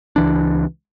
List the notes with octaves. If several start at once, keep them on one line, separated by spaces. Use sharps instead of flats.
C#2 E3 D4